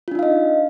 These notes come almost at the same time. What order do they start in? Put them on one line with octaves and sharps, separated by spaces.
F4 D4 D#4 F5 D#5